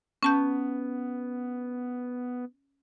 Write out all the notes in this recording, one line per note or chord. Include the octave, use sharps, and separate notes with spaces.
B3 C#4 A5 G6